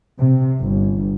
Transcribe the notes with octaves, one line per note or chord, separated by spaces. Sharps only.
C3
G1